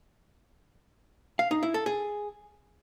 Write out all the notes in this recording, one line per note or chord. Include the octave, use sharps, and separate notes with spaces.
F5
D#4
E4
A4
G#4